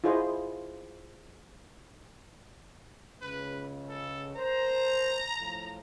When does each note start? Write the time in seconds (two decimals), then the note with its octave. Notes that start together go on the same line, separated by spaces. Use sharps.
0.04 E4 F4 G#4 C5 D#5
3.22 C#2 C#3 B4
3.89 A4
4.36 A#4 C5 A#5
5.40 A2 F3